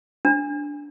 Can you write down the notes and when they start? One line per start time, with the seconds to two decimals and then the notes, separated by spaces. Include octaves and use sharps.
0.25 D4